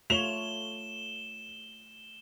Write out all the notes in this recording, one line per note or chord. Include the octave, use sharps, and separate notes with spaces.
A3 F4 C#5 E7 F7 G7